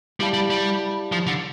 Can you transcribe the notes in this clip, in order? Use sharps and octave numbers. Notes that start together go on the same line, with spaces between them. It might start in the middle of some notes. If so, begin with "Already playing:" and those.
G3 E4 G4 D5 F5 A5
G3
G3
F3
D3